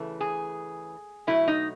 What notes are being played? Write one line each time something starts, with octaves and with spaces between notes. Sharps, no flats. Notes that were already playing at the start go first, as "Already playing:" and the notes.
Already playing: C#3 E3 A3
G#4
B2 F#3 A3 E4
D#4